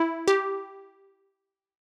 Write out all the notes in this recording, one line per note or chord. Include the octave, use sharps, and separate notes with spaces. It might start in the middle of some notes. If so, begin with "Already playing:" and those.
Already playing: E4
G4